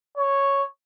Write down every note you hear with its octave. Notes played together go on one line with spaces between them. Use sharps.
C#5